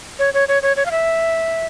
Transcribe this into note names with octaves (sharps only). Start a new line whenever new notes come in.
C#5
C#5
C#5
C#5
C#5
F5
E5